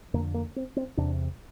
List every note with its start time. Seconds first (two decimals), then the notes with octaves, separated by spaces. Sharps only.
0.14 F2 D3 A#3
0.34 A#3
0.56 C4
0.77 C4
0.97 E2 C3 D4